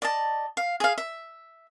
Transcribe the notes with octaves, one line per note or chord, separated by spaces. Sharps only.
D5 D#5 A5
F5
G#4 F5
E5